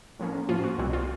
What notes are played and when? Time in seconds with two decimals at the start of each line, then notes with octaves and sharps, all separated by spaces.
0.19 A2 F3 A#3 C#4
0.49 A2 F3 A#3 C#4 F4
0.64 F#4
0.79 C2 B2 G3 C4 F#4
0.93 F4